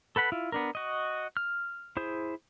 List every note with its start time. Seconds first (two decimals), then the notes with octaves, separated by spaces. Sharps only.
0.16 A4 B4 F#5 B5
0.32 E4 F4
0.52 B3 D4 A#4
0.75 F#4 D#5
1.37 F6
1.97 E4 G#4 C5